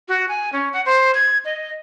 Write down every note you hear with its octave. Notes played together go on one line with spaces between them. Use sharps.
F#4
G#5
C#4
F#5
C5
G#6
D#5